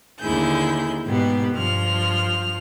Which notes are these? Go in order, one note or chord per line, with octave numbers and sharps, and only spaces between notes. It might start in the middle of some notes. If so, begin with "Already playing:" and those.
D#2 D3 E4 G#4 G6
G#2 B2 B3 G4
G2 F3 F6